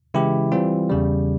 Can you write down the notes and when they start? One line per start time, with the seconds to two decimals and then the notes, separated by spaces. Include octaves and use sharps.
0.14 C#3 E3 G#3 E4 G4
0.52 E3 G3 C4 F4
0.90 E2 C#3 G3